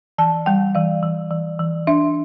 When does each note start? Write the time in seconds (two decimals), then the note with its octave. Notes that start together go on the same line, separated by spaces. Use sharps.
0.18 E3 A5
0.46 G3 G5
0.75 E3 F5
1.03 E3
1.31 E3
1.60 E3
1.87 D4 E5